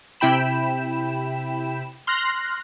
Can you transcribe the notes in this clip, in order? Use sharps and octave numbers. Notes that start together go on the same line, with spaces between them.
C3 E4 G5 B5 E7
C6 F6 F#6 A#6